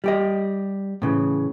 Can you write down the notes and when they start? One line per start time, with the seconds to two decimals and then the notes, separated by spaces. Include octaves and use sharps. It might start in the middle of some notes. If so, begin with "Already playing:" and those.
0.04 G3 G4 D#5
1.02 A2 C#3 E3